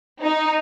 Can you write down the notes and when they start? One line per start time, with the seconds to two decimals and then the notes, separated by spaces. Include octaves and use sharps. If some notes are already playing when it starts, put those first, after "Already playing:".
0.22 D#4